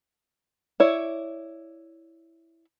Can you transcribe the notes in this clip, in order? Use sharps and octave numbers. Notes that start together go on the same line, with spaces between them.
E4 C#5 D5